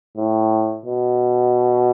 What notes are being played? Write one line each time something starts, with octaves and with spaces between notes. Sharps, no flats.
A2
B2